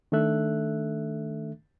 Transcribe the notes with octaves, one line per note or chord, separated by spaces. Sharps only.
D#3 A3 D4 A4 E5 F#6